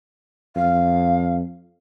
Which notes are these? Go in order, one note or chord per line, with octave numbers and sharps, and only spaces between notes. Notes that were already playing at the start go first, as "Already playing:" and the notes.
F2 F5